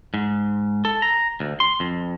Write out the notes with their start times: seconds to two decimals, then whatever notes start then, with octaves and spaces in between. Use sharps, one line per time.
0.14 G#2
0.85 A4
1.02 A#5
1.40 D2
1.60 C6
1.80 F2